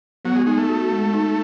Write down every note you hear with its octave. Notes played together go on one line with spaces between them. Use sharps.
F#3 B3
G#3
G#3 D#4
A3
F#4
G#3
D#4